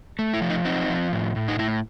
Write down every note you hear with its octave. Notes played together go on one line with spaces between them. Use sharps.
A3
E4
F3
D#4
C4 D#4
F3
A2
A2
D#4
A2 E4